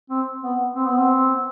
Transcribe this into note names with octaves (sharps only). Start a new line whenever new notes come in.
C4
B3
C4
B3
C4